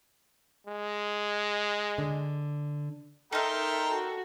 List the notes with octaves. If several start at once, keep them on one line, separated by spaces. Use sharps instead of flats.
G#3
D3
D#4 A4 A#4 E5 G5 A#5 C6
F#4